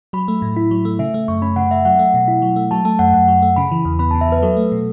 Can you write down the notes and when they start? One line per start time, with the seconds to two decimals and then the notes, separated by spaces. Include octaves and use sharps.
0.13 F#3 B5
0.28 A3
0.42 A2
0.56 E4
0.71 F#3
0.85 A3
0.99 C#3 E5
1.14 A3
1.28 F#2 C#6
1.42 C#4 B5
1.56 C#3 F#5
1.71 A3 E5
1.85 F#3 F#5
1.99 A3
2.14 B2
2.28 E4
2.42 F#3
2.56 A3
2.71 F#3 A5
2.85 A3 A5
2.99 F#2 F#5
3.14 F#2 F#5
3.28 F#3
3.42 A3
3.56 C#3 B5
3.71 E3
3.85 E2
3.99 B3 B5
4.11 C#3 A5
4.21 E5
4.28 E3 B4
4.42 F#3 A4
4.57 A3
4.72 B2